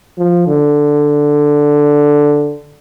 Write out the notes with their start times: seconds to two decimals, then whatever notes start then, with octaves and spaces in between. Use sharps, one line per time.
0.18 F3
0.47 D3